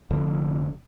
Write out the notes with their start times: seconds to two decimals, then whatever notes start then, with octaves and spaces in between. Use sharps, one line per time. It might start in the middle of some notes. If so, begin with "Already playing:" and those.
0.11 F1 F2 D3